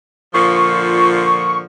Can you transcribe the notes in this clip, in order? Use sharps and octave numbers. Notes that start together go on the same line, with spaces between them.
A#2 D3 F3 C#6